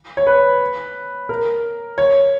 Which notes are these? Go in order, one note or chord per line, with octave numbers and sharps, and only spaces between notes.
C#5
B4
A#4
C#5